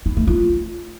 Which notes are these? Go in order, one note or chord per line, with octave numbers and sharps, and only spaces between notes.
E4
A3
F4